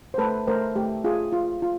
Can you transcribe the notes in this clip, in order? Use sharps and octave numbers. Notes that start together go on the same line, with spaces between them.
C5
A3 A4 B4
A3 A#4 C5
A3 G4
F4 G#4
F4
F4